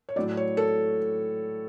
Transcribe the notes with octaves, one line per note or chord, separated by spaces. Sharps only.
C#5
A2 F#3 D5
C#5
A4